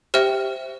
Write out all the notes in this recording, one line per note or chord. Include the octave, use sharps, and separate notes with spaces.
G4 C5 E5 G5 F6